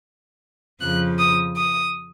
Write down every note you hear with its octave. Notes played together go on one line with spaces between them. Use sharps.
F2 C#3 F3 F#6
D#6
D#6